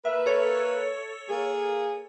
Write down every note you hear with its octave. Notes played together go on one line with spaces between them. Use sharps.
A#3 B4 E5
A4 C#5
A#3 G#4